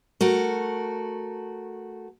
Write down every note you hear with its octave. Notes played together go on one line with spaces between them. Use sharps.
A3 F#4 A#4